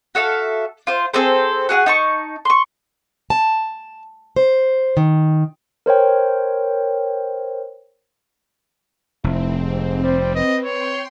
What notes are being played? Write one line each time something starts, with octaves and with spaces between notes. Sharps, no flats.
F#4 A4 E5 F5
F4 C5
C4 G#4 A4 C5
F#4 G#4 F5 F#5
D#4 A5 C#6
C6 C#6
A5
C5
D#3
A#4 C5 C#5 G5
F1 C4 E4
G#2
G3 C5
B4 D#5
C#5 G5 C6